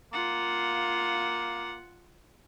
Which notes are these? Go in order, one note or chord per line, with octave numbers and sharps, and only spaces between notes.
A#3 F4 F#5